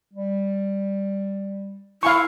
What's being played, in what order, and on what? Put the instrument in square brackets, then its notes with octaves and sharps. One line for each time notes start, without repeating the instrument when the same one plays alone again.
[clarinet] G3
[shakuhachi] E4 [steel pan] F5 G#5 C#6